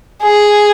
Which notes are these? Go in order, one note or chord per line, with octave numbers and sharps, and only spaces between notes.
G#4